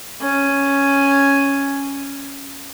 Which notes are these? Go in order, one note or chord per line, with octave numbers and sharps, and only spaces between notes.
C#4 G#5